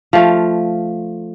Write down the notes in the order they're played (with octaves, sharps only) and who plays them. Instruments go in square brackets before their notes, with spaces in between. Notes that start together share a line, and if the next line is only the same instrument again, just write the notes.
[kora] F3 A3 F4